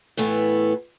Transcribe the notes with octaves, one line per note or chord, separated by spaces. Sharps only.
A2 E3 A3 B3